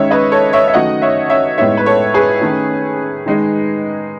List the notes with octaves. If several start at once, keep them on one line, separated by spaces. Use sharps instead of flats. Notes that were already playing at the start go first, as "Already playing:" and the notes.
Already playing: D#3 G#3 C#4 C#5 E5
B4 D#5
A4 C#5
C#5 E5
E5
D#3 F#3 A3 C#4 D#5 F#5
C#5 E5
C#5 E5
A2 G#3 B3 D#4 C#5 E5
B4
A4 C#5
G#4 B4
D#3 A3 C#4
D#3 G#3 D#4